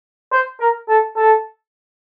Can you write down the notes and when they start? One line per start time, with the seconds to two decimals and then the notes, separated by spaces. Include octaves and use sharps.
0.32 C5
0.60 A#4
0.89 A4
1.16 A4